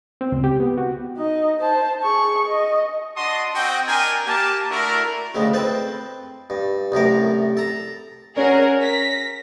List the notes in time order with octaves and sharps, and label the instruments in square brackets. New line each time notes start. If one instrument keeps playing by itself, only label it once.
[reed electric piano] C4
C#2
G4
B3
F#4
[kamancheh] D#4 D#5
C5 A5
G#4 C#6
D#5
[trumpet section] D4 F#4 D#5 A5 C6 D#6
C4 F#4 D#5 G5
D4 A#4 G5 G#5
A#3 G4 A5
A3 D4 E4 F#4 A#4
[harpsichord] D2 A2 C#3 G#3
C4 A4 B4 C5
G2
C2 F#2 A2 A#4
A4 A#5
[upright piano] C#4 [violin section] F#4 G#4 A#4
[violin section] A#6 B6